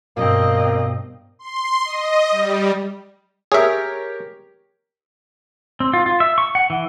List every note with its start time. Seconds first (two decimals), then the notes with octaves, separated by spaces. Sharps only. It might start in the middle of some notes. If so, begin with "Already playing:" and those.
0.17 G2 B2 A#3 C4 D#5
1.39 C6
1.85 D#5
2.31 G3
3.52 G4 G#4 A#4 C#5 E5
5.80 C4
5.93 F4
6.06 F4
6.20 E5
6.38 C#6
6.55 F#5
6.70 E3